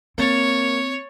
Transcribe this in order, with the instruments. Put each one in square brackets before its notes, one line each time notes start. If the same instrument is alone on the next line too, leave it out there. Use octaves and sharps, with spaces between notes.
[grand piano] A#3 A6 [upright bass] C4 [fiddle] C#5